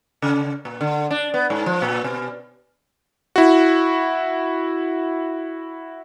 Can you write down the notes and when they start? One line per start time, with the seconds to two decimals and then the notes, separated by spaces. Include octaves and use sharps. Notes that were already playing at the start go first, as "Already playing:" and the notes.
0.22 C#3
0.65 A#2
0.81 D3
1.11 D4
1.34 B3
1.50 G#2
1.66 F3
1.82 A#2
2.04 B2
3.36 E4 F#4